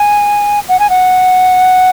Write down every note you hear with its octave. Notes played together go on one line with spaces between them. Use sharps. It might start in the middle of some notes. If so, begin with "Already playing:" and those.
Already playing: G#5
F#5
G#5
F#5